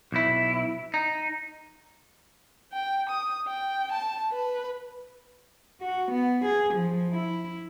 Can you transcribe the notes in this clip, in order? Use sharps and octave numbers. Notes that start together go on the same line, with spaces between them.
B1 E4
D#4
G5
D#6
G5
A5
B4
F#4
B3
G#4
F3
E4